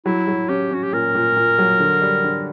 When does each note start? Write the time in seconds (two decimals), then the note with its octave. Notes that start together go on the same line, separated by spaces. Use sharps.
0.06 F#3 E4
0.28 F#3
0.49 C#4 G4
0.71 C#4 F#4
0.83 G4
0.93 A#2 A#4
1.15 A#2
1.36 A#2
1.58 F#3
1.80 D3
2.02 G3
2.24 D3